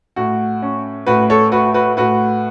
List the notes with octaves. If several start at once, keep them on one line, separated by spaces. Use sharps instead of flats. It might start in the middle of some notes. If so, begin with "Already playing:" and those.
A2 F#4
C#4
A2 F#4 B4
A4 C#5
A3 F#4 B4
F#4 B4
A2 F#4 B4